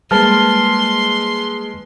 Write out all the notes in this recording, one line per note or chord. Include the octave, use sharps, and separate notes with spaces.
G3 G#3 A#3 B4 A5 C6 F6